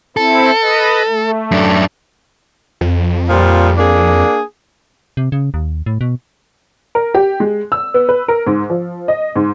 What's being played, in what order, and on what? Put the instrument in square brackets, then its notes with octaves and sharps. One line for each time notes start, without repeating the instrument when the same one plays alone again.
[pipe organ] C4 E4 [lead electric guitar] A4
[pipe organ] B4 D#5
A3
[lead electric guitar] F#2 D4
[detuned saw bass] F2
[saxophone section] A#2 F3 G3
A#3 D4 G#4
[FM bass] C3
C#3
D#2
A2
B2
[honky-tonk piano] A#4
G4
G#3
E6
B3
B4
A#4
G#2
F3
D#5
G#2